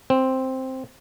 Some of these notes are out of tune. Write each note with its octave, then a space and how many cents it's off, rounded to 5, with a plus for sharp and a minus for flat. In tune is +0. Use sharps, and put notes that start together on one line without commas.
C4 +0